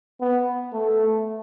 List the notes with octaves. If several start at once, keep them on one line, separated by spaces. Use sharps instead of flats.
B3
A3